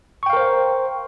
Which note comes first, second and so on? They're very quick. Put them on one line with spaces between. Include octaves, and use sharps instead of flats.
C#6 G5 F5 A#4 C5